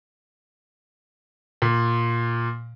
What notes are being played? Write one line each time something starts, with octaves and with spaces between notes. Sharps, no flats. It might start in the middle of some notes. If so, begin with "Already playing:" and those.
A#2